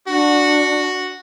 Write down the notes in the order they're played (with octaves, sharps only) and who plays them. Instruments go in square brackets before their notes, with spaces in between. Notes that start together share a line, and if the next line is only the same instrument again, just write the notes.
[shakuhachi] D4 [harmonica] F#4